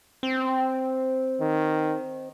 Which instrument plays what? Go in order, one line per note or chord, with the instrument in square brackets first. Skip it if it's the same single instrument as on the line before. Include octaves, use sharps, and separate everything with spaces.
[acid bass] C4
[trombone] D#3